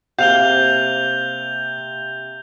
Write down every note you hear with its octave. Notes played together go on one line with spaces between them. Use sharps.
C3 A#3 F5 G6 F7 G7